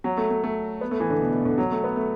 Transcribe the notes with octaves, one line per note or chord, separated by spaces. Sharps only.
F#3
A3
A3
A3
B3
A3
E3
D3
B2
B2
D3
F#3
A3
B3
A3